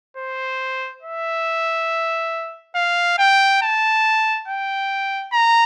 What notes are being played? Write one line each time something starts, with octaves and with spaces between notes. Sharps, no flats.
C5
E5
F5
G5
A5
G5
A#5